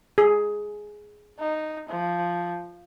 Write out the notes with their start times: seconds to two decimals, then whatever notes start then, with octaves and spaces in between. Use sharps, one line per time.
0.18 G#4
1.40 D#4
1.89 F3